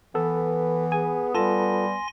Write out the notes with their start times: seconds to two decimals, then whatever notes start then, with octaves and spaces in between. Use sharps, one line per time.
0.15 E3 B3 A4
0.92 G#4 G#5
1.35 G3 F4 A4 G#5 A5 C6 A#6